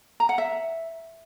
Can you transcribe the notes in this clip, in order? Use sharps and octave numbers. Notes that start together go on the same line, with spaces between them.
A#5
F#5
E5